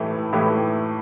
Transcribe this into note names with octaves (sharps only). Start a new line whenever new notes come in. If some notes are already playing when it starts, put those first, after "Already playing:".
Already playing: A2 E3 A3 E4 G4
A2 E3 A3 E4 G4